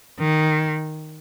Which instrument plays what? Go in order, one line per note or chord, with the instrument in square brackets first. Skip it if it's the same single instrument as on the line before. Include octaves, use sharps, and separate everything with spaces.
[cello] D#3